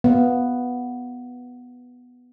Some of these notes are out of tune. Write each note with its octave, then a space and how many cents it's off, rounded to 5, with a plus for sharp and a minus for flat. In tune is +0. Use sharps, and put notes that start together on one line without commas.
B3 +0 F5 +0